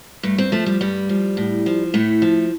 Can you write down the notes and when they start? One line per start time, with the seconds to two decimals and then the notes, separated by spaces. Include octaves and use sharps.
0.23 G2 A3
0.38 C4
0.52 F3 A3
0.66 G3
0.81 G2 G3
1.09 F3
1.37 A2
1.66 F3
1.94 A2 A3
2.22 F3